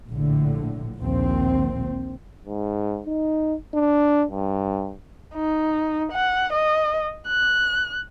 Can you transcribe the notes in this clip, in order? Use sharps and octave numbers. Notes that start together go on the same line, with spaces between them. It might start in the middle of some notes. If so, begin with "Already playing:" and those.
A#1 A2 D3
A#1 D#2 C4
G#2
D#4
D4
G2
D#4
F#5
D#5
F#6